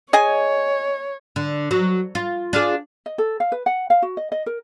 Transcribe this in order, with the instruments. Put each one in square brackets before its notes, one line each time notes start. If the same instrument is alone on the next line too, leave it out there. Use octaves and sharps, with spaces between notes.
[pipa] G#4 D#5 G#5 [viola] C#5
[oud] D3
F#3
F4
D4 F4 G#4
[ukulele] D#5
A4
F5
B4
F#5
F5
F#4
D#5
D#5
A#4